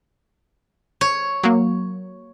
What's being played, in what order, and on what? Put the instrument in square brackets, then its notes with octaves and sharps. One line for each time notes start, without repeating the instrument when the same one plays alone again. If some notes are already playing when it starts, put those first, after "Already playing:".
[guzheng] C#5
[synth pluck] F#3 A#3